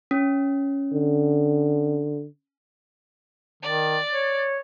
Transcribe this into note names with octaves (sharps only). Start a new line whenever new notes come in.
C#4
D3
D#3 D5
C#5